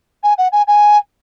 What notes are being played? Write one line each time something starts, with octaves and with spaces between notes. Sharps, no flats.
G#5
F#5
G#5
G#5